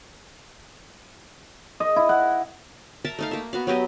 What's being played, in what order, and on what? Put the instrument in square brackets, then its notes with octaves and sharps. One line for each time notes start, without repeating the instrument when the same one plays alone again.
[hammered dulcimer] D#5
E4
F#5
[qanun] A#4 E5 A5 A#5
A3 D#4 F5
A#3 E5
B3 F#4 F5
F#3 B3 G4 D#5